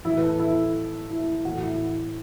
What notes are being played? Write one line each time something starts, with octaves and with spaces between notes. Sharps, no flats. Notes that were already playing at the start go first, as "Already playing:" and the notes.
A2 E3 E4
B4
A4
E4
E4
A2 E3 F#4
E4